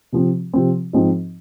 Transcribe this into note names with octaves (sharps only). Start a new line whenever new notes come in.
C3 F3 C4
C3 F3 C4
G#2 F3 C4 D#4